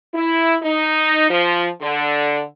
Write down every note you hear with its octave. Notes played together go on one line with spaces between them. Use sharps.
E4
D#4
F3
D3